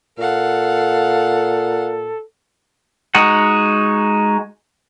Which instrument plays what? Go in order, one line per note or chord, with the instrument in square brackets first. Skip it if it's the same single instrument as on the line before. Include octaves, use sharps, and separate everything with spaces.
[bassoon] A#2 [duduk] A4 [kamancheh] F5 F#5
[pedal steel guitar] G#3 D#4 F#4 F#5